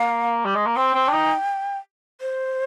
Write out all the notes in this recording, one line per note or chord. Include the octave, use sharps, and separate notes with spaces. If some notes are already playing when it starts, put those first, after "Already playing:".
Already playing: A#3 F5
G3
G#3
A#3
C4 G5
C4
D4
D#4
C5